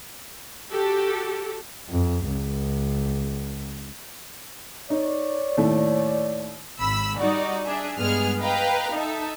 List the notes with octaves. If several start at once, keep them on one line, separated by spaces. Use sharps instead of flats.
F#4 G4 A4
F2
C#2
D#4 C#5 D5
D#2 A2 A3
G#1 B5 E6
G3 D#4 F#4 D5
D4 G#4 E5
G2 G#3 B3 G#4 F6
B4 D#5 F5 G5 A#5 B5
D#4 A4 E5